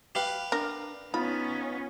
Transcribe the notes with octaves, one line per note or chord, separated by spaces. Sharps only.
G4 B4 F5
D4 A#4
B3 C#4 D#4 F4 B5